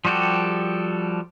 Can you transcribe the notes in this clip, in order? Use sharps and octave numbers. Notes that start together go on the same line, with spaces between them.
F3 G3 F#4 G4 A4